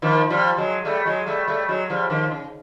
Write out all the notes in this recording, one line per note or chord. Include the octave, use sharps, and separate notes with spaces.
D#3 F3
F3 G3
F#3 G#3
G3 A3
F#3 G#3
G3 A3
G3 A3
F#3 G#3
F3 G3
D#3 F3
C#3